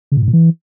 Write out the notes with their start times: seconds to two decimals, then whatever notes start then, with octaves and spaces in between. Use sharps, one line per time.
0.12 C#3
0.17 A#2
0.22 G#2
0.28 A#2
0.33 E3